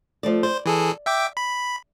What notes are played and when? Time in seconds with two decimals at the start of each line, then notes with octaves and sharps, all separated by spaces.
0.23 F3 A3 D5
0.43 C5 D5
0.66 E3 G#4 A4
1.06 E5 G5 D6
1.37 B5